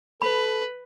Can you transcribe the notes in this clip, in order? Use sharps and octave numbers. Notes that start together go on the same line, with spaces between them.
A4 B4 B5